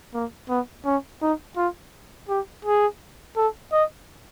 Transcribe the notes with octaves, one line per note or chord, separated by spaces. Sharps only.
A#3
B3
C#4
D#4
F4
G4
G#4
A4
D#5